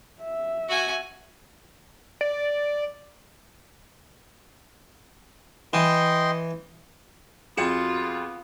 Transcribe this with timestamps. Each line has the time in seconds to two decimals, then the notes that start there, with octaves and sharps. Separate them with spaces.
0.22 E5
0.69 F#4 G#5
2.21 D5
5.73 E3 D#5 G5 C6
7.57 F2 B3 F4 F#4 G#4 C#7 E7